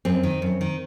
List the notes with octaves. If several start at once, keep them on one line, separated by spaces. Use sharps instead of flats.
F#2 C4
D#3
F#2
D#3